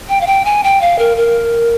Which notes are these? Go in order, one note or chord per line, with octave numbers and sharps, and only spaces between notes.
G5
F5
G5
G#5
G5
F5
A#4
A#4